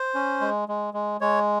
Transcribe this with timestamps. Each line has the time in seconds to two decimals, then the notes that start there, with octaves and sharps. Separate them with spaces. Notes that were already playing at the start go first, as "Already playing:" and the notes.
Already playing: C5
0.15 C#4
0.41 G#3
0.68 G#3
0.94 G#3
1.21 G#3 C#5